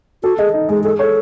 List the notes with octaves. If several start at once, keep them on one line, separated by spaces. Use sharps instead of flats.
F#4 A4
G#4 D#5
D#4
G#3 G#4
G#4 A4
A4 C#5